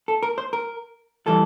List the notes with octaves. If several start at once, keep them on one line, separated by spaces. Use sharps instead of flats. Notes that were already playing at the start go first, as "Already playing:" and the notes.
A4
A#4
C5
A#4
E3 G3 A4